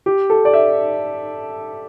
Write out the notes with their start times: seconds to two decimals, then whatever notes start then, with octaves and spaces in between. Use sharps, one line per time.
0.06 G4
0.30 A4
0.45 D5
0.54 E5